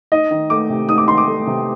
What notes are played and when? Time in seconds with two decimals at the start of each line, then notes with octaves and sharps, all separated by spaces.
0.12 D#4 D#5
0.31 D#3
0.50 A3 D6
0.70 C3
0.89 D#4 D#6
0.98 D6
1.07 D#3 C6
1.18 D6
1.27 A3
1.47 C3